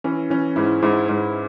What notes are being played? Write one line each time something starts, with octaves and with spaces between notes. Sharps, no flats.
E3 C#4
E3 C#4
G#2 E4
G#2 E4
G#2